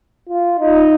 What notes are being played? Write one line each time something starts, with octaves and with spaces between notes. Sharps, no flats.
F4
D#4